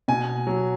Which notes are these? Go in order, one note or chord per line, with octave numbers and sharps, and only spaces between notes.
B2 G#5
F#3